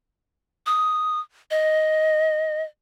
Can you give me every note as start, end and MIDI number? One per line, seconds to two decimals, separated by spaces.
0.66 1.20 87
1.51 2.62 75